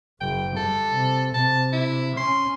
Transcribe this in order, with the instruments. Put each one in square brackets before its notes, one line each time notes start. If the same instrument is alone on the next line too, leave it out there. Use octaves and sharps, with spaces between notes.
[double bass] F#1 [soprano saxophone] G5
[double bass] D3 G3 [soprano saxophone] A4
[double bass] C3
[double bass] C3 [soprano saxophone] A5
[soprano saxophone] E4
[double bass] C#4 [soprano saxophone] C6